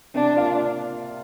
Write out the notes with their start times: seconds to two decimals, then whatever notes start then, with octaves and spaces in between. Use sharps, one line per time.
0.15 C3 D4
0.35 A#3 F4 D5 F5